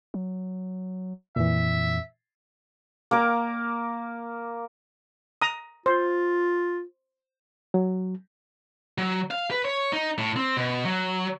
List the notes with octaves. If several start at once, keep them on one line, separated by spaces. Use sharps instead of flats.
F#3
F2 A#2 E3 E5
A#3 A#4 D6
A#5 D#6
F4 C5
F#3
F#3
F5
B4
C#5
D#4
A2
C4
B2
F#3